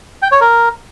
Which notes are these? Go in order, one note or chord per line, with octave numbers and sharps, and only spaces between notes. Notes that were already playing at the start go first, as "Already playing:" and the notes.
G5
C#5
A#4